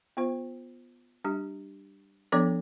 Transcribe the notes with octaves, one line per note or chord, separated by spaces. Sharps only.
B3 F4 C5
G3 D4 G4
F3 B3 D4 A4 D5